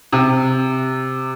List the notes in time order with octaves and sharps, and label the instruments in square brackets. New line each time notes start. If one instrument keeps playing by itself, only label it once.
[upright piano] C3